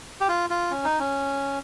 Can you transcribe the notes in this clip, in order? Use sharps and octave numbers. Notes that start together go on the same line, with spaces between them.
G4
F4
F4
C#4
D#4
C#4